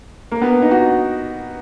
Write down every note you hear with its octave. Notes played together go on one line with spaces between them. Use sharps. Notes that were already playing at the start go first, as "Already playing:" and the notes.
A#3
B3
D#4
F#4